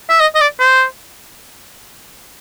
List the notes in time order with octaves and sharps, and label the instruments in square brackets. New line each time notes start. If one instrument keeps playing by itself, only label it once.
[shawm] E5
D#5
D#5
D5
C5